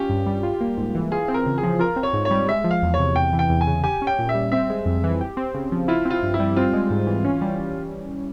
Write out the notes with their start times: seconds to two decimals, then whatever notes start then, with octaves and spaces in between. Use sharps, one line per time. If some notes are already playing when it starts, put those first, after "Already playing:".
Already playing: C#4 F4 G4
0.09 G2
0.26 G3
0.43 F4
0.61 A#3
0.78 G#2
0.95 E3
1.12 F4 G#4
1.28 C4
1.34 A#4
1.46 C#3
1.58 G#4
1.63 F3
1.79 F4 A#4
1.96 C4
2.03 C#5
2.13 G#2
2.25 C#5
2.31 G3
2.48 G#3 E5
2.64 F3
2.71 F5
2.82 E2
2.94 C#5
2.99 C3
3.16 E2 G5
3.33 E3
3.39 G5
3.50 E2
3.61 G#5
3.67 C#3
3.84 G4 G#5
4.02 C#4
4.07 G5
4.19 A#2
4.29 E5
4.35 G3
4.52 C4 E5
4.70 G#3
4.86 F2
5.04 E3
5.21 G4
5.37 C4
5.54 C#3
5.72 F3
5.88 E4 F4
6.05 C4
6.10 F4
6.23 G2
6.34 E4
6.40 G3
6.56 C4 F4
6.73 G#3
6.90 G#2
7.07 E3
7.25 C#4
7.42 G3